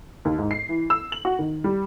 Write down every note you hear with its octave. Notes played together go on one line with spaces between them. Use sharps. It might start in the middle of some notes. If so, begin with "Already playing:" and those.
D#2
G#2
C7
E3
E6
F#7
F#4
D#3
G3